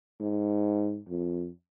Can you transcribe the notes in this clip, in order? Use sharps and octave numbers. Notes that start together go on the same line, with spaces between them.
G#2
F2